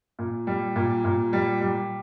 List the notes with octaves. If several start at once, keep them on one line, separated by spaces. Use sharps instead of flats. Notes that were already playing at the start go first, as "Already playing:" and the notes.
A#2
G3
A#2
A#2
G3
G3